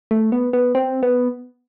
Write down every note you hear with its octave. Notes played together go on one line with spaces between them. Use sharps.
A3
B3
B3
C4
B3